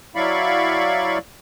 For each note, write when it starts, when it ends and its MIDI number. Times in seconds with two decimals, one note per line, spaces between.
0.16 1.18 54
0.16 1.18 64
0.16 1.18 74
0.16 1.18 77
0.16 1.18 83
0.16 1.18 85